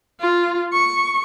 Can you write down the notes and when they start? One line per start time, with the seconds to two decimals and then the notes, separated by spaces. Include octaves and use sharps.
0.20 F4
0.73 C#6